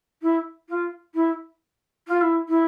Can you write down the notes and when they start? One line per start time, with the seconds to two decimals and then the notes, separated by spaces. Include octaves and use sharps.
0.22 E4
0.69 F4
1.15 E4
2.08 F4
2.21 E4
2.49 E4